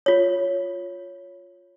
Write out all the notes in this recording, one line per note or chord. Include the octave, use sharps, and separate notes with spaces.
F4 C#5